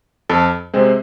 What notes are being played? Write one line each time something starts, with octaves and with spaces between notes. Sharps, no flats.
F2 A4 A5
C3 G#3 C4 C5